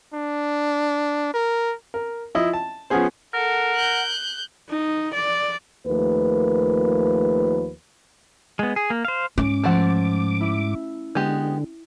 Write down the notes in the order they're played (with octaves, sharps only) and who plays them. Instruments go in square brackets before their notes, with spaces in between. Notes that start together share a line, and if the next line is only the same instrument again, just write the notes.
[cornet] D4
A#4
[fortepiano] A#4
F3 E4 D#5
A5
F3 B3 C#4 G#4 C5
[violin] A4 [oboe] A#4 [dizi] F#5
[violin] F#6 G6
[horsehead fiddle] D#4
D5
[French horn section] D#2 F3 A3 A#4 B4
[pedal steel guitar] G#3 B3
G#4
A#3
C5 F5
[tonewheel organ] G#2 D6 [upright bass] C#4
[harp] F3 A6 E7 [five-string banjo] A3 F#5
[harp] E4
[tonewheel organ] D3 [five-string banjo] G#3 B3 G4